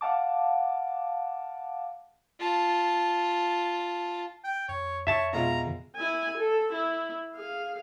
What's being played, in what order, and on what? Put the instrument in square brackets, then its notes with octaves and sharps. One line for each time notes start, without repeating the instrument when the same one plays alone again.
[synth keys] F5 F#5 A5 D6
[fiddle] F4 A5
[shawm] G5
[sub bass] F2 [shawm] C#5
[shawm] C#5 [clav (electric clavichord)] E5 A5
[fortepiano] B2 G#3 F4 [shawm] A#5
[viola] E4 G#5
A4
E4
G#4 F5